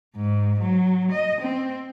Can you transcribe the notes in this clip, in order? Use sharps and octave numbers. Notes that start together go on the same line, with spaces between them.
G#2
F#3
D#5
C4